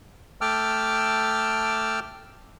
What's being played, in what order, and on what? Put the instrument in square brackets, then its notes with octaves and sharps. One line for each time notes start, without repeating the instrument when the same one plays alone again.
[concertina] A3 G5 A5 D6 E6 F6